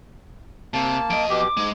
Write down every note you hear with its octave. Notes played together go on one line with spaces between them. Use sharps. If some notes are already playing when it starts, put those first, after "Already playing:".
C3 A#3 A5
F2 D#5 D7
B2 G4 D6
G#2 G#3